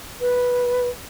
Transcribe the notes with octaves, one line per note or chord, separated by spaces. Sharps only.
B4